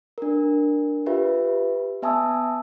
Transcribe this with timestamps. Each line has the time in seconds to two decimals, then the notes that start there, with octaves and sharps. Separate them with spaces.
0.18 D4 A#4
1.06 F4 G4 B4 E5
2.02 B3 E5 G#5 A5 D#6 E6